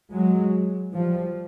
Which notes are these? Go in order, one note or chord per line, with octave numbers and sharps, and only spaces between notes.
F#3 G#3
F3 G3